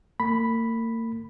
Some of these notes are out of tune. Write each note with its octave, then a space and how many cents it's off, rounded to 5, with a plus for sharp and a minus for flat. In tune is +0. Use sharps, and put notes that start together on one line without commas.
A#3 -40 B5 +0